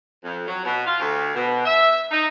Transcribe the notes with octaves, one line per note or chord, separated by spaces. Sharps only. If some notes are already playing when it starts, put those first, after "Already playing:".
F2
F#3
B2
F4
D2
B2
E5
D#4